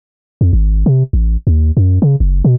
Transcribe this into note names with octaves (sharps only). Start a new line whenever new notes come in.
F2
G#1
C3
A1
D#2
F#2
C#3
F#1
B2